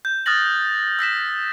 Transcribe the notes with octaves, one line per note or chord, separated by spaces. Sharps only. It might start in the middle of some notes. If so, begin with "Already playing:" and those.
G6
D#6 F6 F#6 A6 A#6 F#7
E6 A#6 B6 E7